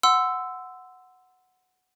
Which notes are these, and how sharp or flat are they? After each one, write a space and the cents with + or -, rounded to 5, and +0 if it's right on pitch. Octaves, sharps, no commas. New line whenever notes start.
F#5 +0 C6 -20 E6 +0